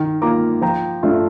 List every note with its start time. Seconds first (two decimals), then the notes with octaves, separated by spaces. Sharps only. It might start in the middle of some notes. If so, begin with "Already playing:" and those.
Already playing: D#3
0.22 A#3 F4 A#5 D6
0.62 F3 G5 A#5
1.03 A3 D4 F4